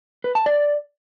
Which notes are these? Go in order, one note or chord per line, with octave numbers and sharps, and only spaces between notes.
B4
A5
D5